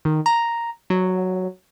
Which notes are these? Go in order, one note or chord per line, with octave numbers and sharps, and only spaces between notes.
D#3
A#5
F#3